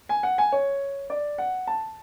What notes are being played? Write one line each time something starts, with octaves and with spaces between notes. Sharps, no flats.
G#5
F#5
G#5
C#5
D5
F#5
A5